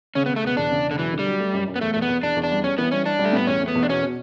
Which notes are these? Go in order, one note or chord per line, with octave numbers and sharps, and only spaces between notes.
C#3 C#4
B3
C#3
A3
E1 B3
E2 D4
C#3
E1
D3
E3 F#3
D3
G3
F#3
A3
F#2
F#2
B3
E2 A3
E2 A3
B3
E2
E2 D4
E2
D4
G3
G3 C#4
E3 B3
G3 C#4
G3 D4
G3
A3
A2 B3
E2 C#4
A3
B3
E2
D4
B2 C#4
B2